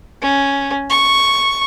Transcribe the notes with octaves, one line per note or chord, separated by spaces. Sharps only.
C#4
C#6